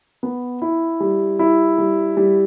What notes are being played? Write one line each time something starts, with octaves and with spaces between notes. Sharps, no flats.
B3
E4
G3
E4
G3
G3